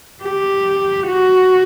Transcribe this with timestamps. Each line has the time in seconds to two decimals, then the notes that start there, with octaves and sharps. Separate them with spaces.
0.23 G4
1.07 F#4